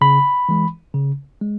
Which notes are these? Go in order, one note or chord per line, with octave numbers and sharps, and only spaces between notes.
C#3 B5
E3 G#3
C#3
G#3